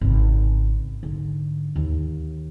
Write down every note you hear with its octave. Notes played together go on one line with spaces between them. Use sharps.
G#1 C#3
G#2 D3
D#2